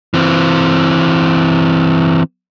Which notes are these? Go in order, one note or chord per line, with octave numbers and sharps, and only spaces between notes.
E3 C4